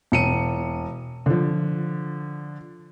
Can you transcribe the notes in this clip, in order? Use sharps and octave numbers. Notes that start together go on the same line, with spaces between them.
E1 C#7 D#7
D3 F3